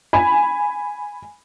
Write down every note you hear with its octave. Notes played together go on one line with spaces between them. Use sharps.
G#5 B5